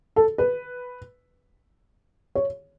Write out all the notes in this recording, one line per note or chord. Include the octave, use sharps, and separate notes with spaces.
A4
B4
C#5